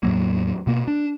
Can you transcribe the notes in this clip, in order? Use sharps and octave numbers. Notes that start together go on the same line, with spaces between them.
E2 A2 F#3 A#3
B2 A#3
D4